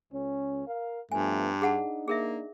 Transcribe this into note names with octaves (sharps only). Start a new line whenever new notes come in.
C#2 C#4
A#4 F5
G2 F3 A3 B3 G#5
D4 D#4 G#4 F#5 A5
A#3 G#4 A#4 E5